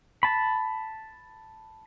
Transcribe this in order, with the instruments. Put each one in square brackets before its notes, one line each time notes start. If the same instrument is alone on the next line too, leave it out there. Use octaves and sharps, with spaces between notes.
[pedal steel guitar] A5 B5